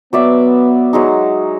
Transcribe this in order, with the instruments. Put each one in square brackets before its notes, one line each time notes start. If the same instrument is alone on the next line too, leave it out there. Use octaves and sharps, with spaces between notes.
[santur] F#3 D5 E5 [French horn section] B3
[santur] F#3 G#3 D#4